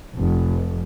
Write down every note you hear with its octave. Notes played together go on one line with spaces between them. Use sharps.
F1